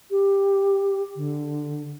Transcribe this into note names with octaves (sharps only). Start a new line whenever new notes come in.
G4
D3